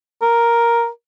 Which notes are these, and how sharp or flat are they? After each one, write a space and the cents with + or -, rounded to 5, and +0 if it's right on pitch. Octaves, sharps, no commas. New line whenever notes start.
A#4 +5